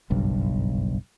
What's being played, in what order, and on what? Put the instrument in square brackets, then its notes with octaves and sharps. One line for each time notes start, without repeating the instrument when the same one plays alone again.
[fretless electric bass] F#1 B1 G2